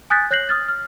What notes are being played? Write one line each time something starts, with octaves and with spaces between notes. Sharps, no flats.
G#5 D#6 F#6 G6 A6 B6
C#5 F#6 G6 A#6 C7 F#7
D#6 F6 A6
F6